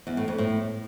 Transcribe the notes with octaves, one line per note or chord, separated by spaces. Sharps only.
E2
A2
F2
A2